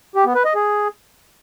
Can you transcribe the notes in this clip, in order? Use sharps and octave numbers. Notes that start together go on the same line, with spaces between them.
G4
B3
B4
D#5
G#4